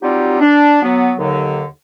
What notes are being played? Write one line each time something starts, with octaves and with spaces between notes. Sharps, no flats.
F#3 G3 C4 D#4 F4 G4
D4
F#3 B3
D#2 D3 F#3